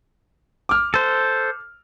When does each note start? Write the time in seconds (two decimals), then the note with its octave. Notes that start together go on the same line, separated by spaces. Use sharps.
0.69 D6 F6
0.94 A4 C5